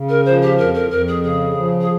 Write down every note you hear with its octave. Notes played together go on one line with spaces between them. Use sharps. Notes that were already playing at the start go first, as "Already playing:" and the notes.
Already playing: C#3
A#4
F3 C5
G4
F2 A#4
A#4
F2 A#4
G#4
C#3 G#4
F3
G#4